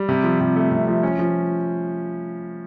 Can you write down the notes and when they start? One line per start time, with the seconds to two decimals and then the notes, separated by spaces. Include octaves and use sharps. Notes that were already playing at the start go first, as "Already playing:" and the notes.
Already playing: G3
0.09 C3
0.24 F3
0.41 C3
0.56 A3
0.71 C3
0.88 F3
1.03 C#4
1.19 F3